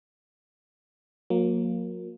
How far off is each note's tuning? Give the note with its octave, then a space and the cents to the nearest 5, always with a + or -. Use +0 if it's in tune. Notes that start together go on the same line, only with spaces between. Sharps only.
F#3 -40 A#3 +0